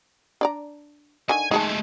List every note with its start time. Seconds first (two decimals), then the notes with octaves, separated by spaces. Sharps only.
0.41 D4 D5 A#5
1.29 D3 D#3 G#5
1.51 G#3 A3 D#4 G#4 A5